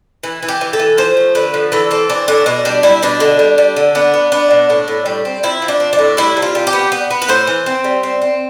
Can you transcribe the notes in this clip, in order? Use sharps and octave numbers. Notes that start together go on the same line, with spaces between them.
E3
E3
G4
E3
A4
E3
F3 C5
A3
D3 B4
F3
E3 A4
C4 A4
E3 D4
A2 D4
B2 D4
G3 D4
G3 E4
B2 D4
D3
G3
G3
D3
B3 D4
B3
B3 D4
B2
A2 D4
A2
G3
C4
F3 E4
F3
D4
C4
D4
A2
G3 E4
C3
F4
G3
G4
B3
B3
B3
B4
A2 C5
E3
C4
G3
C4
C4